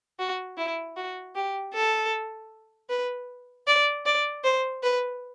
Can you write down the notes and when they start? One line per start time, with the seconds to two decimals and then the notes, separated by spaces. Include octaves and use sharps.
0.19 F#4
0.58 E4
0.96 F#4
1.35 G4
1.74 A4
2.90 B4
3.67 D5
4.06 D5
4.44 C5
4.83 B4